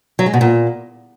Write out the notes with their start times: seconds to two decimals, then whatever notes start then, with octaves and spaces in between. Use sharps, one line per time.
0.19 F#3
0.26 G#3
0.34 B2
0.41 A#2